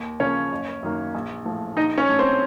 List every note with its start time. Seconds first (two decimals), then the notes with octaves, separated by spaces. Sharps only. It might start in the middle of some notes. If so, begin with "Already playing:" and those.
Already playing: D#2
0.20 C#3 F3 A#3 C#4 C#5
0.52 F#1
0.83 F#2 D#3 A#3
1.14 A#1
1.45 A2 F3
1.77 A#1 D#4 D#5
1.98 C#4 C#5
2.09 A2 A3
2.19 C4 C5